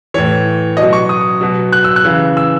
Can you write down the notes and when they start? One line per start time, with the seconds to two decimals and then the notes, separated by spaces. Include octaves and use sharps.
0.14 A2 E3 C#5
0.77 B2 D#5
0.82 F#3
0.93 C#6
1.09 D#6
1.41 B2 F#3
1.72 F#6
1.84 E6
1.96 F#6
2.05 C#3 E3
2.37 E6